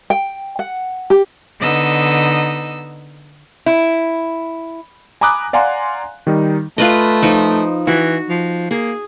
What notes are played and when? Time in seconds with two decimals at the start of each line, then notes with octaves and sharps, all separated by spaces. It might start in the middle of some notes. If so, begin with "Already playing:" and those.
0.10 G5
0.59 F#5
1.10 G4
1.59 D3 B3 D#4 D#5 E6
3.66 E4
5.21 G#5 A#5 B5 D6 D#6 F#6
5.53 D5 F5 F#5 G#5 A#5 C6
6.27 D#3 G3 D#4
6.78 A3 F4 B4 D#5
7.23 F3 D#4
7.87 E3 F#4
8.29 F3
8.71 A#3 G#4